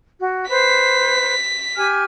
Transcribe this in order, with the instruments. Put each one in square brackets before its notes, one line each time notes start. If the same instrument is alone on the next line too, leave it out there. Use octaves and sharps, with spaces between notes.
[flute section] F#4
[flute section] B4 C5 [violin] B6
[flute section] G4 G#5 F6